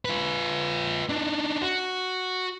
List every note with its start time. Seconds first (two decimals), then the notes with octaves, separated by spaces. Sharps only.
0.05 F4 B4
1.09 D4 D#4
1.62 F#4